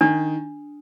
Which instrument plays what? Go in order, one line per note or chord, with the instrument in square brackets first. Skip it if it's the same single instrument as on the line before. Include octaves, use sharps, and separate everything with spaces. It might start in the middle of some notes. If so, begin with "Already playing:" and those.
[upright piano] D#3 [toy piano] D4